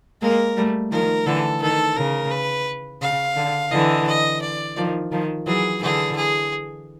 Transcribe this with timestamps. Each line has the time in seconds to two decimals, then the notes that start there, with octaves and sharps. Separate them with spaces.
0.21 G#3 A#3 A#4
0.57 G3 A3
0.91 D#3 F3 A#4
1.26 D3 E3 A4
1.62 D#3 A4
1.96 C#3 A#4
2.31 B4
3.02 C#3 F5
3.36 D3
3.72 D3 E3 D#5
4.07 D#5
4.41 D5
4.77 D#3 F3
5.12 D#3 F3
5.46 E3 F#3 G#4
5.82 D3 E3 G#4
6.16 G#4